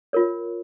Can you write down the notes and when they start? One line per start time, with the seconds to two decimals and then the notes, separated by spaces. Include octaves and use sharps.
0.13 F4 A#4 C#5